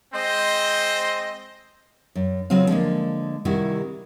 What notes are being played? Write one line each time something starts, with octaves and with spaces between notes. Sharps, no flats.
G#3 C4 C5 D#5
F#2
C#3 F#3 C4 F4 F5
D3 F3 G#3 A#3
C3 D#3 G3 E4 F#4